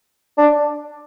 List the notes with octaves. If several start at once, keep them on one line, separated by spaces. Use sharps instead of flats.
D4